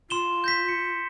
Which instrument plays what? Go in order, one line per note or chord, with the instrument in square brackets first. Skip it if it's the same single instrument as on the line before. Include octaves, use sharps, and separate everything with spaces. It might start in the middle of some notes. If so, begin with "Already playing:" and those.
[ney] F4 [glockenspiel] C6 E7 G7
[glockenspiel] G6 A#6 B6
C#7